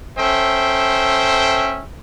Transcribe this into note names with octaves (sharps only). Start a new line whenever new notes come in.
C#4 A4 C5 E5 G5